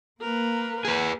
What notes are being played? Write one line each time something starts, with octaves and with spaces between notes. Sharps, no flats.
A#3 A#4 B4
G#4 B4